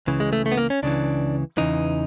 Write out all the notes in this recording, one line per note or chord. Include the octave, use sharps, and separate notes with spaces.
C#2 C#3 E3
G#3
A3
A3
B3
A#3
C#4
C#2 C#3 E3 D4
E2 C#3 E3 D#4